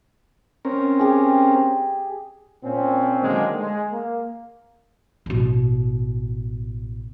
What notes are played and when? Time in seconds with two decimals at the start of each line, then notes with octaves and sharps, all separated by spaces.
0.65 C4 C#4 A#4
0.99 G4 G#4
2.64 A#2 C4 C#4
3.23 D3 D#3 F#3 G#3 A#3 C4
3.60 G#3
3.92 A#3
5.26 A1 B2